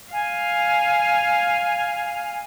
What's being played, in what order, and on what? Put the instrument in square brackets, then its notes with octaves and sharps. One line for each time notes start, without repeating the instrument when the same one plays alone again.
[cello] F5 [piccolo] G#5